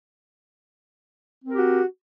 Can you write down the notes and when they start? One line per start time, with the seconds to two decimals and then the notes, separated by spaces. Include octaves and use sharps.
1.44 C4
1.49 A#4
1.53 G4
1.57 F#4